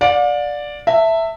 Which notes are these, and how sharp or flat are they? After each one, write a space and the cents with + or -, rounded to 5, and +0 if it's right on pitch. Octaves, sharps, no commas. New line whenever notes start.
D5 +0 F5 +45
E5 +0 A5 +35